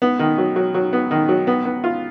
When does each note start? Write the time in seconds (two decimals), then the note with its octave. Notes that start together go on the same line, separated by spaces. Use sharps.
0.02 B3
0.19 D#3
0.38 F#3
0.56 F#3
0.74 F#3
0.93 B3
1.11 D#3
1.29 F#3
1.47 B3
1.65 B3
1.84 F4